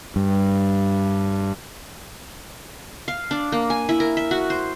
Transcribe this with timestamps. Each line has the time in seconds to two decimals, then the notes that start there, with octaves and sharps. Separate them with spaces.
0.16 G2
3.08 F5
3.31 D4
3.52 A#3
3.70 G#5
3.89 E4
4.00 A#4
4.17 E5
4.31 F#4
4.50 C5